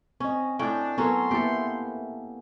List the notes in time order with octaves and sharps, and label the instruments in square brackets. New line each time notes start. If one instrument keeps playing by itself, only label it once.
[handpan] C4 D#5 [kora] C#4
[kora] A2 C#4 G5 [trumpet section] D4
[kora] F#3 C#4 [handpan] B3 A4 A#4 [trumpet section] C6
[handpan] A#3 B3 E4 [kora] G4 A4